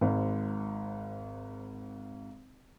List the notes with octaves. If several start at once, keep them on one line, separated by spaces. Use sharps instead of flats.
G#1 G#2